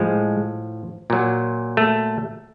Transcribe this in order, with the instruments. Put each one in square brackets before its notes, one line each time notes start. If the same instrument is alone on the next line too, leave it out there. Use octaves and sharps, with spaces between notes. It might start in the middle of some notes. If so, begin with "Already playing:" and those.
Already playing: [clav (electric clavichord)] A2 F3 G#3
A#2 F#3
A3